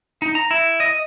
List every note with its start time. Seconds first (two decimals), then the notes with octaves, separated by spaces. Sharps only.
0.22 D#4
0.35 A#5
0.51 E4
0.80 D#5